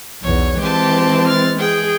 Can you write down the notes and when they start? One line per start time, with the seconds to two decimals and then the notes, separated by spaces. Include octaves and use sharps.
0.23 B1 E2 C#5
0.60 E3 G#3 C4 G4 A5
1.27 F6 A6
1.59 G#4 G5